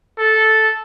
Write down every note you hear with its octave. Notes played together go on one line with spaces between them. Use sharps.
A4